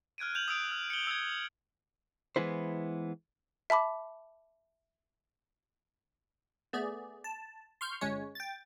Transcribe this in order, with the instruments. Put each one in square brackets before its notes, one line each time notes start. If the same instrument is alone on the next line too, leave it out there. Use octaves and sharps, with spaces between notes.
[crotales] F6 F#6 G#6 D7 D#7
G6 F7 F#7
D#6 E6 D7
F6
C#7 F#7 G7
E6 G#6
[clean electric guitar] E3 G#3 B3 E4 C5
[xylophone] E5 A5 B5 D6
[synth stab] A3 B3 G#4 D5
A5
C6 C#6 F6 G6
G1 G#3 C#4 C#5
G5 A6